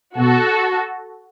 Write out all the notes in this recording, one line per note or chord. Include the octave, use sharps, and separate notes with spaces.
B2 F#4 A4